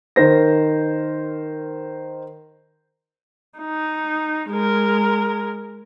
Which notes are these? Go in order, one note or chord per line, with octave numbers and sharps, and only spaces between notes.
D#3 A#4 C5 A#6
D#4
G#3 A#4